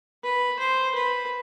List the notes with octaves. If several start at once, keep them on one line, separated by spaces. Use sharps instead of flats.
B4
C5
B4